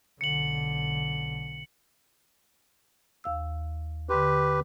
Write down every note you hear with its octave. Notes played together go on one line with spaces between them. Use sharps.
B1 D3 C#7 F#7
D#2 F5 E6
D3 G4 B4 C6